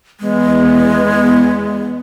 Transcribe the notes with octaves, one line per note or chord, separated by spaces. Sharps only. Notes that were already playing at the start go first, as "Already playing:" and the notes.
E2 G#3 B3